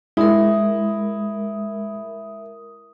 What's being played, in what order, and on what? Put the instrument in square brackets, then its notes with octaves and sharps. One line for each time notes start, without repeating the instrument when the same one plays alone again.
[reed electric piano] G#3 [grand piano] E4 [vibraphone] A#4 D#6